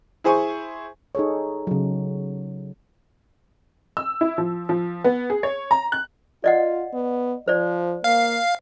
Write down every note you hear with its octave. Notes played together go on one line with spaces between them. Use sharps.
E4 G#4 C5 G#5 C#6
D#4 G#4 A4 C#5
C#3 F#3
E6
E4
F3
F3
B3
G#4
C#5
A#5
F#6
F4 D5 D#5 F#5
B3
F3 C5 D5
A#3 F5